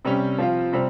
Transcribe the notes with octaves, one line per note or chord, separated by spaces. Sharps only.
C3 G3 C#4 G4
F3 C4 F4
C3 G3 C4